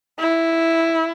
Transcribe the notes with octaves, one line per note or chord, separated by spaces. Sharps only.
E4